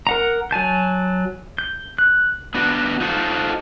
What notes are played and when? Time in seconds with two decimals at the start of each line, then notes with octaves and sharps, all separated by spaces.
0.07 A#4 F#5 A#5
0.51 F#3 G#5 A5 G6
1.58 G6
1.99 F#6
2.55 B3 D4 F#4
3.00 D#4 F4 F#4 A4 B4 C5